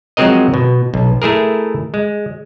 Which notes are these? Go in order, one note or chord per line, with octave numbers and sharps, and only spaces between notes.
F3 F#3 G#3 C4 A#4 D#5
B2
B1
A3 E4 G#4 A#4
G#3